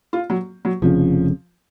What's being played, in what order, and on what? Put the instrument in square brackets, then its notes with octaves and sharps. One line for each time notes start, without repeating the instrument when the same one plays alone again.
[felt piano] F4
F#3
F#3
[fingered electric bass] F1 F2 C#3 [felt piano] F3